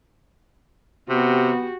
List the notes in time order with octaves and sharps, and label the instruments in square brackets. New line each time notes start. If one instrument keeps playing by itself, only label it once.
[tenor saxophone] C3 [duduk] B3 [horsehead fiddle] F#4 G4